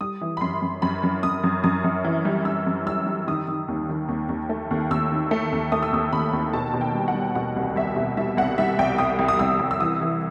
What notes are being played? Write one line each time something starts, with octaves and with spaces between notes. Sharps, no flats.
G3 D#6
E3
B5
F#2 C6
F#2
F#2 B5
F#2
F#2 D#6
F#2
F#2 D#6
F#2
E3
G3
G3 E6
F#2
G3 E6
G3
D#3 D#6
D#3
D#2
D#3
D#2
D#2
A3
D#2
D#2 E6
D#3
A3
D#2
A3 D#6
E6
D#2 D#6
D#2 B5
D#2
B2 A5
B2
G5
G3
F#5
G3
B2 F#5
C2
C2 E5
B2
G3 E5
C2 F#5
G3 E5
C2 G5
C2 D#6
C2
D#6
C2 E6
C2
E6
E3 D#6
E3